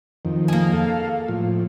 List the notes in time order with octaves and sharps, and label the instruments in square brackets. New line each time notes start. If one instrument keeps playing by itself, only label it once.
[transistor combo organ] F2 D#3
[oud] A#3 G#4
[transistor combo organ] A4 F5
A2 F3